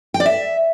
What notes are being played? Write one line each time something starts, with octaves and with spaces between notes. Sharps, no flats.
G5
D5
E5